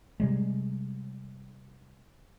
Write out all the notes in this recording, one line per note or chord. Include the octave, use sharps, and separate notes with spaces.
C3 G3 G#3